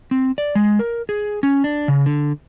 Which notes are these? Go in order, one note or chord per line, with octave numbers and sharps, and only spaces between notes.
C4
D5
G#3
A#4
G#4
C#4
D4
C#3
D3